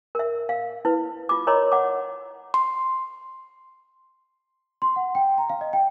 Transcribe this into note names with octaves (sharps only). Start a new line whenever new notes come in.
A#4 E5
F5
E4 B4
F4 D6
A#4 C#5 D#5 A#5 C6 D6
F#5 D6
C6
C6
F#5
G5
A#5
F5
D#5
G5